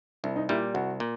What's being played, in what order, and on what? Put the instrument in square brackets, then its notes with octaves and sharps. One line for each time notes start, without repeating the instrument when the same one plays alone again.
[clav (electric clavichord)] C2 [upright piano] E4
[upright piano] D#4
[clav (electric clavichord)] A#2 G3 [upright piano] E4
[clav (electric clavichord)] C2 [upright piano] F#4
[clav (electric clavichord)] A#2